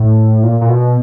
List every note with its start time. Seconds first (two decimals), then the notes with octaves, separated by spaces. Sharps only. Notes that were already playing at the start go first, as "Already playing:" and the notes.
Already playing: A2
0.43 A#2
0.61 A#2
0.69 B2